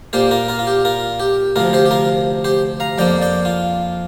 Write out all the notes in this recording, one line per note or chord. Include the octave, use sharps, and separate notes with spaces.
A#2 A#3 F4 G4 C5
F4 A#4
F4 A#4
F4
G4
F4 A#4
G4
D2 C3 F3 F4 A#4
G4 C5
G4
F4 A#4
G4 C5
F5 A#5
F2 F3 A#3 D5 G5
D5 G5
F4